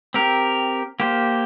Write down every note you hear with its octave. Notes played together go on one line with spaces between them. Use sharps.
C4 G4 A#4
A#3 G4 C5